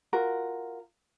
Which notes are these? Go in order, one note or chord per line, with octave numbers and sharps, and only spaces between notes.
F4 F#4 A#4